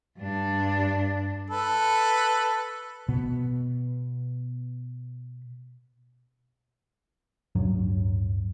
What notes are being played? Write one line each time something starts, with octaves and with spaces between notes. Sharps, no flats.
G2 D4
A4 B4
B2 B3
D1 G2 F#3